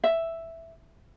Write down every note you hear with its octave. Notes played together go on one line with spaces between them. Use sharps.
E5